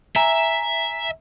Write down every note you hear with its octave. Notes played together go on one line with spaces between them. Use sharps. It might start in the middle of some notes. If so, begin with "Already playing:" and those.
E5 G#5 A#5